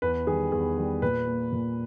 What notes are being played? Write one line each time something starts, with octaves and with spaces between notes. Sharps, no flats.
E2 B4
D#3 G3 G#4
E2 G#4
D#3 G3
A#2 B4
A#3
A#2